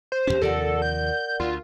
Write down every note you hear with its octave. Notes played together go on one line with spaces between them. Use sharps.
C5
D#2 G#2 C#4 G4
D#2 C3 F3 A4 A#4 D5 F#5
G6
D2 F4